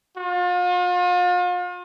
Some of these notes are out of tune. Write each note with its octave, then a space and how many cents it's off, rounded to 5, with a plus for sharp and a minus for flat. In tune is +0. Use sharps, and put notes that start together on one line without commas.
F4 +40